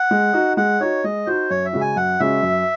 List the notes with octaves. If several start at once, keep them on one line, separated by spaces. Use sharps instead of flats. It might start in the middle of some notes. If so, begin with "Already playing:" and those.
Already playing: F#5
G#3
D#4 F#4
G#3 F#5
D#4 F#4 C#5
G#3 D#5
D#4 F#4 C5
F#2 C#5
E5
C#3 G#3 C#4 F#4
G#5
F#2 F#5
C#3 G#3 C#4 F#4 E5
F#2